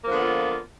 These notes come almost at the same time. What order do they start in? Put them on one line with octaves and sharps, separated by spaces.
A#3 F3 D3 B3 F4